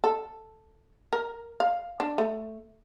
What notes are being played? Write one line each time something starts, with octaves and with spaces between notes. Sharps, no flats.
A4
A#4
F5
D4
A3